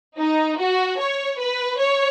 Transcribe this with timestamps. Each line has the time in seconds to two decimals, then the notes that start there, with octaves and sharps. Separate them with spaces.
0.18 D#4
0.59 F#4
0.99 C#5
1.40 B4
1.80 C#5